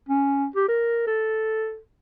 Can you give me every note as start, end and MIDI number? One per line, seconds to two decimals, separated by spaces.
0.09 0.47 61
0.56 0.67 67
0.69 1.06 70
1.07 1.78 69